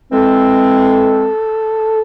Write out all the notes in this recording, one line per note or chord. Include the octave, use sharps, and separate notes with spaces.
E3 G#3 C4 A4